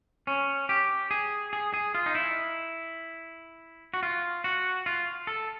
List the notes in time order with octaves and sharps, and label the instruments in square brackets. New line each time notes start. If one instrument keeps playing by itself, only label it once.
[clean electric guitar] C#4
G4
G#4
G#4
G#4
F4
D#4
E4
F#4
F4
F#4
F4
A4